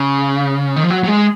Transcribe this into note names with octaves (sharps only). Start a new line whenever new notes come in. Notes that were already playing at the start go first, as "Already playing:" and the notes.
Already playing: C#3
D#3
F3
F#3
F#3
G#3